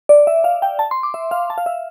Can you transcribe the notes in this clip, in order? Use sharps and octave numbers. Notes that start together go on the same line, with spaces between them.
D5
E5
F5
G5
A5
C6
D6
E5
F5
A5
F5
E5